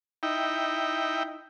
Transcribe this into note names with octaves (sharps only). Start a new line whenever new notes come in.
D#4 E4 G5